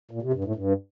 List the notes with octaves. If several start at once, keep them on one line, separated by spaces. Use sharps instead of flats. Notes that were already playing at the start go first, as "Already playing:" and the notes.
A#2
C3
G2
A2
G2